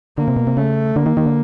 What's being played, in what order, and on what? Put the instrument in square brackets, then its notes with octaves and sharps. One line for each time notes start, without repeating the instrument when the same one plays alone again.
[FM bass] D3 [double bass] A#3
[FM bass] C3
B2
C3
[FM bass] C#3 [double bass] A3
[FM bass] D3 [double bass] A#3
[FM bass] D#3
D#3
D3